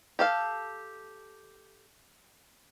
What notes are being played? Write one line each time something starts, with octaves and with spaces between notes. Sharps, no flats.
G4 A4 F5